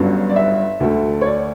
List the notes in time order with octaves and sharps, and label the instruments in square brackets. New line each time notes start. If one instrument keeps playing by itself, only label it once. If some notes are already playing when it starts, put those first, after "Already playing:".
Already playing: [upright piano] G1 G2 F#3 C#4
D5
E5
D2 D3 A3
C#5
D5